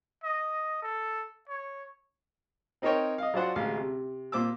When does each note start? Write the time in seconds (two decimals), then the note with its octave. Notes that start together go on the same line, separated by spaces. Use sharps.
0.24 D#5
0.82 A4
1.49 C#5
2.82 C4 D#4 A#4 C5 C#5 G5
3.18 D#5 F5
3.34 F#3 D4 F4 C5 F#5
3.56 A1 D2 G#3 F5
3.77 C3
4.32 A#2 C5 D6 E6